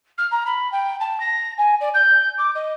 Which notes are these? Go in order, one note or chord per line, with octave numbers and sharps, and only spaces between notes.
F6
A#5
B5
G5
A5
A#6
G#5
D5
G6
D6
D#5